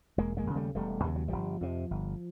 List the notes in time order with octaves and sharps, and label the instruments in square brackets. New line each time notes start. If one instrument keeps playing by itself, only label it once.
[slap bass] E1 G#3 A#3
G#3 A#3
D#2 C#3
G3 A3
E1 G3 A3
D#2 C#3 G3
F#3
G1 F3 G3
F2 C3
G1